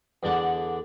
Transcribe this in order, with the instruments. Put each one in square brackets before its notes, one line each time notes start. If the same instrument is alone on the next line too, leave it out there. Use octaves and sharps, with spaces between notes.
[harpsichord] E2 D3 D4 D5 F#5